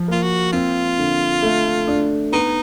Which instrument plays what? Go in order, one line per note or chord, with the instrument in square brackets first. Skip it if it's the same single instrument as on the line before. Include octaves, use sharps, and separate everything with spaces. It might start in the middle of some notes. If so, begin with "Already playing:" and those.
Already playing: [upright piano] F3
[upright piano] A#3 [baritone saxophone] F4
[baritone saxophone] F#4
[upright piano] C4 [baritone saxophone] F4
[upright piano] D3
A3
D4
[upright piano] B3 [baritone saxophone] D#4